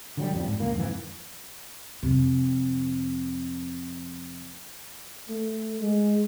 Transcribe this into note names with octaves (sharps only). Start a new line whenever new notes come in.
D3 F#3 G3
A1 F2 F3 G3
A1 G#2
C#2 A#3
F2 G#2 E3 F3
F2 C3
A3
G#3